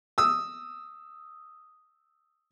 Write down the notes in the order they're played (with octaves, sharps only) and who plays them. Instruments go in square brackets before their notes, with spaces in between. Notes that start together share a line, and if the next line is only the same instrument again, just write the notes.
[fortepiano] D#6 E6